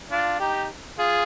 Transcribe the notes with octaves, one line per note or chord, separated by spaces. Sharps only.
D4 F4
D#4 G4
F4 G#4